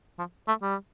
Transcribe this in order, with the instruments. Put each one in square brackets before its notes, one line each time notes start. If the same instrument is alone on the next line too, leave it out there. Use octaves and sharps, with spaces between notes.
[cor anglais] F3
A3
G3